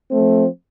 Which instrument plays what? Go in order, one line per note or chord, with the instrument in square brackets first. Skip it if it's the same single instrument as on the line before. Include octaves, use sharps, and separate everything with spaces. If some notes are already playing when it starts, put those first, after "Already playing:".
[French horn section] F3 A3 C4